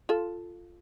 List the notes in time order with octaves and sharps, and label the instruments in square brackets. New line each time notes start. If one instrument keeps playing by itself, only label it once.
[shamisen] F4 A4